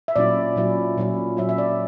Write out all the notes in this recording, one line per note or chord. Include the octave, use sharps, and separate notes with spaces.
E5
A#2 F#3 C#4 E4 D5
A#2 F#3 C#4 E4
A#2 F#3 C#4 E4
A#2 F#3 C#4 E4 E5
E5
D5